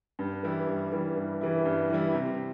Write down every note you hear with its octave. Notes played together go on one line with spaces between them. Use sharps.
G2
E3 G3 E4
G2
E3 G3 E4
G2
E3 G3 E4
G2
E3 G3 E4
C3